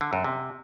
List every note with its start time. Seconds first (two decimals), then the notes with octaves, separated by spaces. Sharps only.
0.01 D3
0.13 F#2
0.24 C3